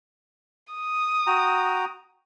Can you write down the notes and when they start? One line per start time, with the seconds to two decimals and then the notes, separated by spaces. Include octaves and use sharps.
0.73 D#6
1.27 F#4 G5 A#5